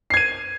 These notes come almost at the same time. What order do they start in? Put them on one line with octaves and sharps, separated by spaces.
C7 G#6 D#7